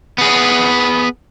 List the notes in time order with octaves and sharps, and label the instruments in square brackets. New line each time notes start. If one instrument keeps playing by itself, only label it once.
[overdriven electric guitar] B3 G#4